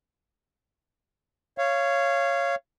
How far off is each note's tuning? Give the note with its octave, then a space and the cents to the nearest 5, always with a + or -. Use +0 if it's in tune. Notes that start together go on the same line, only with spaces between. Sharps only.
C#5 +0 F5 -20